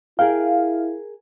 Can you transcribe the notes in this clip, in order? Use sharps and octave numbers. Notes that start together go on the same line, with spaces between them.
E4 G#4 A#4 F5 G5